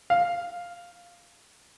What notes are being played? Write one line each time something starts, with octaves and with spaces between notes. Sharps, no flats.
F5